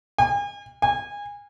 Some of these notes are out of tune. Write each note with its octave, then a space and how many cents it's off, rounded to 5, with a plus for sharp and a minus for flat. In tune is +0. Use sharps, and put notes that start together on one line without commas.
G#5 -40
G#5 -25